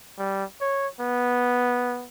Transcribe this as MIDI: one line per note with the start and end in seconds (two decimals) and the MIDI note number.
0.18 0.44 55
0.61 0.88 73
1.00 2.07 59